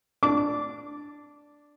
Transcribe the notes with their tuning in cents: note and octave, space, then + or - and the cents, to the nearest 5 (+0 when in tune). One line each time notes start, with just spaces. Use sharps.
D4 +0 D6 -15